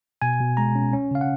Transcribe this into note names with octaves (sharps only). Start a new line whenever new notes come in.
B2 G#5
B2
G#3 A#5
C#4
C#4
C#3 F5
F#5